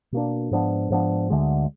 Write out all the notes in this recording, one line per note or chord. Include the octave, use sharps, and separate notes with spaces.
B2 A#3 D4
G#2 F3 B3 D4
G#2 F3 B3 D4
D2 D3 G#3